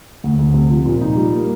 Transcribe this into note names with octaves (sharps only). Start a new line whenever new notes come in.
D2
D2
C3
F3
A#2
D#4
G3
A#3